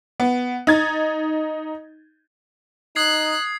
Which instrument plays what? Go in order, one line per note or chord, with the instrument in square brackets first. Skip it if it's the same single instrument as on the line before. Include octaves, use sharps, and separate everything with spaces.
[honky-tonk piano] B3
D#4 G#6 A6
[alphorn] D#4 [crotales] D#6 G#6 C7 [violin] F#6